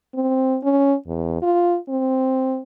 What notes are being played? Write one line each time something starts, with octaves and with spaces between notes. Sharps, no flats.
C4
C#4
E2
F4
C4